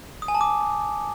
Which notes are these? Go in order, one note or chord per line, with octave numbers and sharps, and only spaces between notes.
D#6
G#5
A5
D6